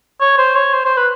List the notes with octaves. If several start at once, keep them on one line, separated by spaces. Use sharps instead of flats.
C#5
C5
C#5
C5
C5
B4